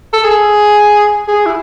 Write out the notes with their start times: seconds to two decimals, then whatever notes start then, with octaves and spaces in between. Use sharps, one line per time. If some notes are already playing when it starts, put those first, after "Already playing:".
0.13 A4
0.24 G#4
1.28 G#4
1.46 E4